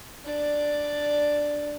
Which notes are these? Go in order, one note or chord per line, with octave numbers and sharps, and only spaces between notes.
D4 D5